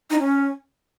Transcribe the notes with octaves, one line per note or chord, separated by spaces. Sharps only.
D#4
C#4